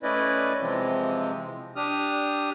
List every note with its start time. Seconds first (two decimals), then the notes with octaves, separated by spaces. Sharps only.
0.03 A3 C#4 E4 B4 D5 D#5
0.61 C3 E3 F3 G#3 C4
1.76 D4 G4 D#6 F6